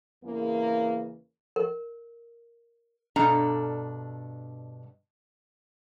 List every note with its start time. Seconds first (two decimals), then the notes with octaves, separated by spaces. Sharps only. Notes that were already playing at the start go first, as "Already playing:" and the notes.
0.24 E2 C#3 E3 A#3
1.56 A#4
3.16 G2 B2 D4 A4 A#5